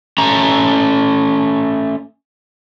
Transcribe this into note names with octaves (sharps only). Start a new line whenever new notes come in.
A3 C#4 A#5